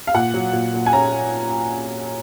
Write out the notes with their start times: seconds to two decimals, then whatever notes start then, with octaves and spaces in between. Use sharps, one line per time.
0.07 F5
0.14 A#2 F#5
0.34 F#3
0.53 A#2
0.74 A#2
0.86 G#5
0.93 C#4 A#5